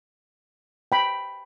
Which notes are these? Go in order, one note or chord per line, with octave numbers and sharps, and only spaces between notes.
G5 B5